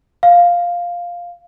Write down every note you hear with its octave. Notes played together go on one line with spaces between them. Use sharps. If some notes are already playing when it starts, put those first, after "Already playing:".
F5